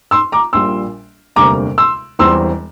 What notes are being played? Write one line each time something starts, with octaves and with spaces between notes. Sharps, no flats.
C6 E6
A#5 D6
A#1 A#2 G3 C6 E6
E1 D2 C3 G3 A#3 A#5 D6
C6 E6
E1 E2 E3 G3 C4 C6 E6